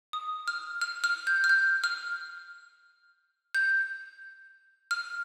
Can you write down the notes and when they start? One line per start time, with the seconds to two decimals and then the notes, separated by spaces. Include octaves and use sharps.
0.13 D#6
0.48 F6
0.81 F6
1.04 F6
1.27 G6
1.44 F6
1.49 G6
1.84 F6
3.55 G6
4.91 F6